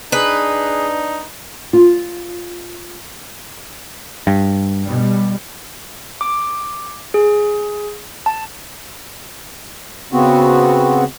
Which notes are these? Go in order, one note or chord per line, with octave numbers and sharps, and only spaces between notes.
D4 D#4 G#4 B4
F4
G2
B2 G3
D6
G#4
A5
C#3 B3 C4 F#4